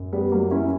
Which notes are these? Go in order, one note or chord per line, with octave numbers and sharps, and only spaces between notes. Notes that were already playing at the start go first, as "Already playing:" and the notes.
Already playing: F#2
G3 B3
F#3 A#3
C#4 E4